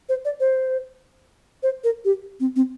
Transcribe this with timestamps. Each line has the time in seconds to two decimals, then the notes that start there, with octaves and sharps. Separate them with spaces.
0.09 C5
0.25 D5
0.40 C5
1.63 C5
1.84 A#4
2.05 G4
2.40 C4
2.56 C4